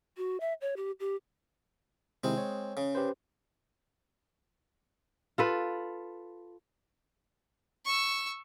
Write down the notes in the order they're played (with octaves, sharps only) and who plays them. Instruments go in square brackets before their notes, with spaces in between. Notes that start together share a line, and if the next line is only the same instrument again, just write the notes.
[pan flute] F#4
E5
C#5
G4
G4
[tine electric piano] C3 D#3 E4 [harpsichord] G#3 C4
[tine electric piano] C#5
[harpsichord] C#3
[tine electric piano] G4 B4 C5
[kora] F4 A4 B4
[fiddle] C#6 E6